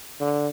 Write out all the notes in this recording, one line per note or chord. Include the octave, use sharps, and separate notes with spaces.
D3